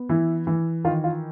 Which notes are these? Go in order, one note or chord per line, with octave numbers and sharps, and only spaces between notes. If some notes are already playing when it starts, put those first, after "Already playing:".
Already playing: B3
E3 E4
E3
D#3 F4
F4